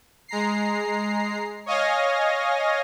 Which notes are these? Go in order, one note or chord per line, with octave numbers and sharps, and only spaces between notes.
G#3 A#5 C7
C#5 D#5 F5 G#5 A#6